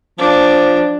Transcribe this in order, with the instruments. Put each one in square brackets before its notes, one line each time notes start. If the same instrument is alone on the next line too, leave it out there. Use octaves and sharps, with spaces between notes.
[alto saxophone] F3 [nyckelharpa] D4